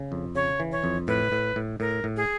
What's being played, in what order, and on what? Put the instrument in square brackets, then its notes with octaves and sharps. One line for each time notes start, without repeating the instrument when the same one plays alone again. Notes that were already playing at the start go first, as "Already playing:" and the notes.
Already playing: [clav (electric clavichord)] C#3
F2
[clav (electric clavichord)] C#3 [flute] C#5
[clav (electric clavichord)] E3
[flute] C#5
[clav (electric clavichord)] F2
[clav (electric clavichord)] A2 [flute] B4
[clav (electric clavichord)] A2
A2
[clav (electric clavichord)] A2 [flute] A#4
[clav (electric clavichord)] A2
[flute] G#4